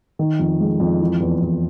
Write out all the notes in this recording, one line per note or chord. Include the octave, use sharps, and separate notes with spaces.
D#3
F2
G#3
F2
E3
E2
E2